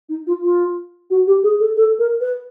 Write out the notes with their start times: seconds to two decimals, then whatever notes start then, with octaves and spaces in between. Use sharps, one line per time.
0.09 D#4
0.27 F4
0.43 F4
1.10 F#4
1.27 G4
1.43 G#4
1.60 A4
1.77 A4
1.99 A#4
2.21 B4